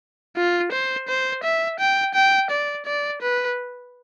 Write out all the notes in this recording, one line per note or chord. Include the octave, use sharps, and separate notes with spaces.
F4
C5
C5
E5
G5
G5
D5
D5
B4